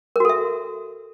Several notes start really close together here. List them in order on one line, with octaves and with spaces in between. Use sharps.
A#4 F#4 A4 E5